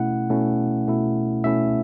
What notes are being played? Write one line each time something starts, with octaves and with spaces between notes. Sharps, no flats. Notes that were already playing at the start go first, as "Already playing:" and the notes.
Already playing: B2 A3 C#4 E4 F#5
B2 A3 C#4 E4
B2 A3 C#4 E4
B2 A3 C#4 E4 E5